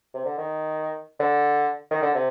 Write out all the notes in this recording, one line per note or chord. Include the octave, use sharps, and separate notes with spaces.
C3
D3
D#3
D3
D#3
D3
C3